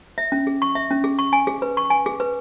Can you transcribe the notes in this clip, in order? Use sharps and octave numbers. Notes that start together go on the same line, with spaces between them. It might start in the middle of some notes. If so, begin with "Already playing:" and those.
E5
C#4
G#4
C#6
E5
C#4
G#4
C#6
G#5
G#4
B4
C#6
G#5
G#4
B4